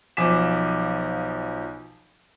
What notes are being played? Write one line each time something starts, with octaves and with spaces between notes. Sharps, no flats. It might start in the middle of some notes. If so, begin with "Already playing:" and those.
B1 F3 G#5 D6 B6 E7